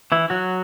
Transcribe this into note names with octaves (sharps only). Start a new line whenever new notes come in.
E3 E4
F#3 F#4